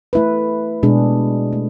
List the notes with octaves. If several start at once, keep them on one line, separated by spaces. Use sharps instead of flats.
A3 E4 B4
B2 G#3 D4 G#4
A3